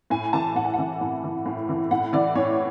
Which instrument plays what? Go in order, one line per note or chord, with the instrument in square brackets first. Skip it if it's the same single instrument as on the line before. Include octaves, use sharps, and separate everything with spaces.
[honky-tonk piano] A2 G#5
E3 A5
A2 F#5
G#5
E3 F#5
A2
E3
A2
E3
A2 F#5
E3 D5
A2 C#5